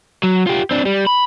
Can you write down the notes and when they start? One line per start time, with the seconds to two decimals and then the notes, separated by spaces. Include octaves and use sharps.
0.23 F#3
0.47 F4 G4
0.71 C4 D4
0.85 G3
1.07 B5